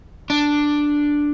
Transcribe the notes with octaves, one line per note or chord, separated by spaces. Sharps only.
D4